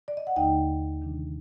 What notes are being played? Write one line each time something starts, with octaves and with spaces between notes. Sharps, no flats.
D5
D#5
F#5
D#2 D3 A3 D#4 D#5 G5
C3 D#3 G3 D4